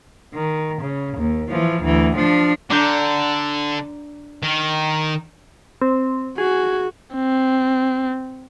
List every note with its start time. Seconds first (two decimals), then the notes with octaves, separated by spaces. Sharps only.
0.34 D#3
0.81 C#3
1.17 D#2
1.49 E3 F3
1.83 D2 E3
2.15 F3 D4
2.70 D3 D4 A#5 G6
4.43 D#3
5.82 C4
6.38 F#4 G#4
7.15 C4